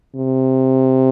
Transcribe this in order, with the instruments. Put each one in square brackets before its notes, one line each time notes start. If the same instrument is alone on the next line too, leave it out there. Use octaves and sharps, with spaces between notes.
[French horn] C3